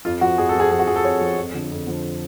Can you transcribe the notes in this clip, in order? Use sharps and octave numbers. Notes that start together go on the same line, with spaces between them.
F2 F4
F3 F#4
F2 G#4
A4
F3 G#4
F2 G#4
F#4
F3 G#4
A4
F2 C#5
F3
F2
D3 F3
F2
D3 F3